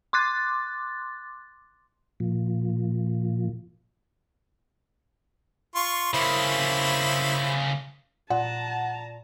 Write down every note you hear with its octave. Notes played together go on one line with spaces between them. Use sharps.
C6 D6 F#6 A6
A#2 F3
F4 C6 C#6
C#3 A#3 E4 C5 B5
A#2 F#5 A5 A#5